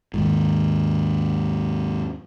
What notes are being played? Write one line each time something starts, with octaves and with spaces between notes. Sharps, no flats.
D#2 G#2